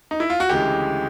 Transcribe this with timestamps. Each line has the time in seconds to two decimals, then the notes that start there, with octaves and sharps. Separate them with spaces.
0.11 D#4
0.20 E4
0.30 F4
0.40 F#4
0.49 D2 C#3 E3 G#3 G4